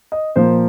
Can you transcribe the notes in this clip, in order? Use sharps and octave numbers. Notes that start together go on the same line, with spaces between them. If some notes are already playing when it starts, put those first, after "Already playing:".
D#5
A#2 F3 A#3 C5